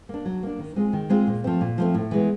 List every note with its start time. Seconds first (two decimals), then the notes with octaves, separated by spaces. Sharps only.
0.09 A#3 D4
0.25 F#3
0.43 A#3 D4
0.59 D#3
0.76 G#3 C4 F4 G#4
0.93 D#3
1.10 G#3 C4 F4 G#4
1.27 A#2
1.44 F3 A3 C4
1.61 A#2
1.78 F3 A3 C4
1.94 A2
2.11 E3 G#3 B3